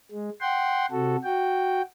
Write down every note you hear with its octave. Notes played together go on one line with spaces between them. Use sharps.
G#3
F#5 G5 C6
C3 F#4 A4
F#4 G5